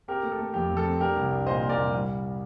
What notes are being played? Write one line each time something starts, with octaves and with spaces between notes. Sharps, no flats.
C4 G4 A#4
A3
A4
A3
F2 G4
F2
A4
C4
D4 G4 A#4
C2
D4
A#2 C5 D#5
A#2
A#4 D5
C2
G3